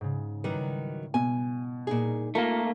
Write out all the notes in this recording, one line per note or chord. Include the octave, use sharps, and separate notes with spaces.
G#2 C#3
D#3 F#3 G3 E4 B4
B2 G#5
A#2 D#4 G#4
A3 A#3 F4 A#4